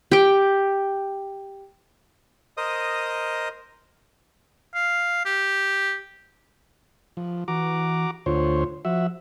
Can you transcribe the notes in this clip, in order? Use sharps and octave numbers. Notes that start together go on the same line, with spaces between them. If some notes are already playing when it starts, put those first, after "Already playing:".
G4 G5
A#4 C5 D#5 D#6
F5
G4
F3
E3 F#4 A#5 D6
D2 F4 C5 C#5
F3 F#4 E5